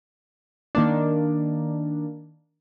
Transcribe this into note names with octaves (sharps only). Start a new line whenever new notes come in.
D#3 A#3 D4